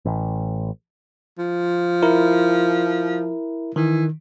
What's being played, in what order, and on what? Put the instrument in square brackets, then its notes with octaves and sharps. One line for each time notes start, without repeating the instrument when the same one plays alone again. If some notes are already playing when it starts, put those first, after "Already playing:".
[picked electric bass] A1
[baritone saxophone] F3
[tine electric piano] E4 A#4
[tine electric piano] D#3 [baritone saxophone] E3